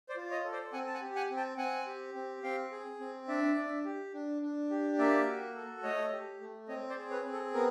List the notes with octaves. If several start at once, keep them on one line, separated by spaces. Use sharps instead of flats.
C5 D5
F4
C#5 D#5
A4
C5 D5
C4 F#5 G#5
A5
F#5 G#5
G4
F#5 G#5
C4
G5 A5
C4 F#5 G#5
G4
C4
C4 F5 G5
G#4
C4
D4 D5 E5
D4
G4
D4
D4
G4
A#3 D5 E5
F#4
A4
A3 C#5 D#5
G4
A3
C4 C#5 D#5
C5 D5
G#4
B4 C#5
C4
A4
B3 A#4